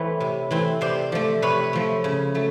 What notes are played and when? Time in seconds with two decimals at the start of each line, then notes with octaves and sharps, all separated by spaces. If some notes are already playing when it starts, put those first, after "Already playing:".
Already playing: E3 A3 C4 B4 C#5
0.20 C3
0.51 E3 A3 C4
0.81 C3 C5 D5
1.12 F3 A3
1.42 C3 B4 C#5
1.73 F3 A3
2.04 C#3
2.35 F#3 A3